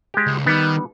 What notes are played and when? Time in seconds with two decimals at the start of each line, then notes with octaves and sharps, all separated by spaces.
0.14 G#3 G4
0.26 C#2
0.46 D#3 G3 B3